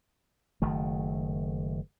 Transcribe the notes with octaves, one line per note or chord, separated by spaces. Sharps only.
F#1 D#3 A3